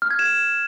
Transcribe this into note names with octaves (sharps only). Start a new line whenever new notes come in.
F6
G#6
E7